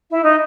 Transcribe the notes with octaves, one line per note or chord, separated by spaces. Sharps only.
E4
D#4